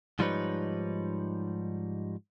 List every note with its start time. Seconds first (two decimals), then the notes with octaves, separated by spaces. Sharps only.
0.19 G#2 F3 G3 D#4 B4 C#5